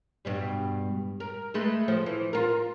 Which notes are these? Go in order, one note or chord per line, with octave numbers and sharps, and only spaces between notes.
G2 B2 G3
A#4
G#3 A3 B4
F3
E3
F4 A#4